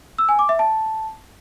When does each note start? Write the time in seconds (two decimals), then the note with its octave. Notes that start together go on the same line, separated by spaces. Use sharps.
0.18 E6
0.29 G#5
0.39 D6
0.49 E5
0.59 A5